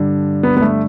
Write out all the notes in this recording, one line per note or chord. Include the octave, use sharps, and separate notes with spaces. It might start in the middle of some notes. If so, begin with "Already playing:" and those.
Already playing: G2 D3
B3
B3
A3